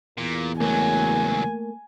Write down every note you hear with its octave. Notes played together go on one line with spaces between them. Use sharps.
E2 A#2
C#2 F#3 A3 A#3 G#5